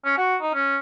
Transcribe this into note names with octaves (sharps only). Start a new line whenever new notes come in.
C#4
F#4
D#4
C#4